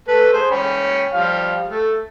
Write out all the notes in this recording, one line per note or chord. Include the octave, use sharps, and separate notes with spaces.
A3 A4 B4
G#4 C5
C#4 G5 B5
F3 G3 F5
A3